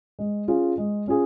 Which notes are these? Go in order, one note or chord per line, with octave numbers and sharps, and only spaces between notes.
G#3
C#4 F4 G#4
G#3
C#4 F4 G#4